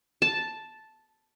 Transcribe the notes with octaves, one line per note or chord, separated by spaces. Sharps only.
A5